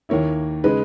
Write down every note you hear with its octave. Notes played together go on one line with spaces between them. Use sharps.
D#2 D#3 A#3 E4 C#5
C#3 G#3 D#4 B4